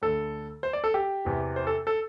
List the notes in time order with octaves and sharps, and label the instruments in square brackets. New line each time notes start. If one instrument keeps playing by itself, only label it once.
[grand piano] D2 D3 A4
C5
D5
A4
G4
E2 C3 E3
C5
A4
A4